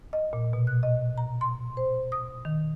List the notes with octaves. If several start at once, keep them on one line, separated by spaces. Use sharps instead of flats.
D#5
A#2
B2
F#6
D#5
A#5
C6
C5
D#6
D#3